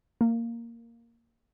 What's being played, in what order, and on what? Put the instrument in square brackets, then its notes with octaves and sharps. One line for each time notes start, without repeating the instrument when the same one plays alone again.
[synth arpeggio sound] A#3